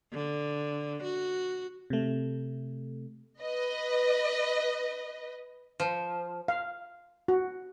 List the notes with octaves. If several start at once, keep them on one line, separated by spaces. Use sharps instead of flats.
D3
F#4
C3 A3
B4 D#5
F3
F5
F#4